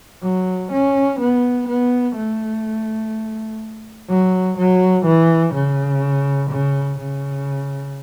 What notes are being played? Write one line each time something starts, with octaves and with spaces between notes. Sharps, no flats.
F#3
C#4
B3
B3
A3
F#3
F#3
E3
C#3
C#3
C#3